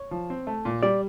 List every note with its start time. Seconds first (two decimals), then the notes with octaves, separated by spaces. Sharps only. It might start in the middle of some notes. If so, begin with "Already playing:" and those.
Already playing: C#5
0.11 F3
0.30 C4
0.47 A3
0.65 A#2
0.83 G3 D5